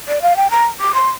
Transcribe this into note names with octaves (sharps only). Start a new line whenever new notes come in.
D5
F5
G5
A#5
D6
C6